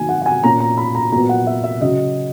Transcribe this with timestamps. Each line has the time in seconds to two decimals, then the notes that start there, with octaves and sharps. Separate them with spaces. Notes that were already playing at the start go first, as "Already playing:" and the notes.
Already playing: D#3 F#3 A#3 G#5
0.09 F#5
0.22 F#5
0.26 G#5
0.43 A#2 A#3 C#4 A#5
0.60 A#5
0.77 B5
0.95 A#5
1.12 A#2 F#3 B3 A#5
1.29 F#5
1.47 E5
1.64 E5
1.81 C#3 F#3 C#4 D#5